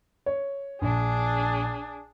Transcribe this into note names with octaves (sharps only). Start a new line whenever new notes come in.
C#5
A#1 D4 G#4